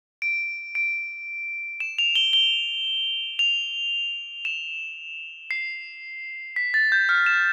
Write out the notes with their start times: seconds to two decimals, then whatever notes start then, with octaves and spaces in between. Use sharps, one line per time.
0.22 D7
0.75 D7
1.80 E7
1.98 F7
2.15 G7
2.33 G7
3.39 F7
4.45 E7
5.51 C7
6.56 B6
6.74 A6
6.92 G6
7.09 F6
7.26 E7